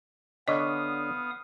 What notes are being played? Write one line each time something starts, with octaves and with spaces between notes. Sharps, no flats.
D3 B3 C#5 D#5 F5 D#6